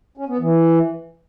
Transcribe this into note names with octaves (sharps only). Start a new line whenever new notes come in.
C#4
B3
E3